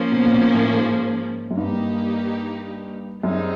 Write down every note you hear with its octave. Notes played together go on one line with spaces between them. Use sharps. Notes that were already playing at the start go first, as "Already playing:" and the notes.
Already playing: F3 A#3 C#4
B2
A#2
B2
A2
G#2
F#2
G2 A#3 D#4 G4
F#2 G3 C4 D#4 G#4